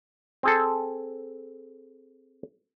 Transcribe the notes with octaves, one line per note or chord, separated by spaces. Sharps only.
C4 G#4 A4